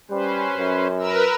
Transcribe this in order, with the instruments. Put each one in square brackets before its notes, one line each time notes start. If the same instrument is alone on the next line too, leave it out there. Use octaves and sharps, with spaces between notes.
[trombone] G3 [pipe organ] C#4 B4 C5
[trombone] F#2
[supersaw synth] A#4 B4 [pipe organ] E6